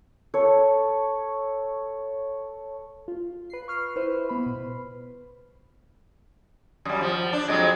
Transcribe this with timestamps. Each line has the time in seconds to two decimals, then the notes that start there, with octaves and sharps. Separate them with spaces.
0.34 A4 C#5
3.08 F4
3.50 B4 C7
3.68 C#6 F6 C7
3.96 E4 B4 C5
4.29 B3 B5
4.46 B2
6.85 F#2 G3
7.01 F3
7.32 D4
7.48 F2 F#3 G#3